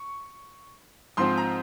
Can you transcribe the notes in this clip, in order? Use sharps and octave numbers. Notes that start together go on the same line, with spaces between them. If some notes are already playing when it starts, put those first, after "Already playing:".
Already playing: C#6
G#2 F3 C4 C6
A#5